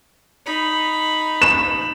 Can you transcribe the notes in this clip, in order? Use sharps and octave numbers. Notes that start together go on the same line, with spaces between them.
D#4 B5
E7